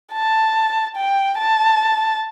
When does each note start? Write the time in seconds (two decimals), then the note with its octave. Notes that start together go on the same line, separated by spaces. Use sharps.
0.13 A5
0.96 G5
1.38 A5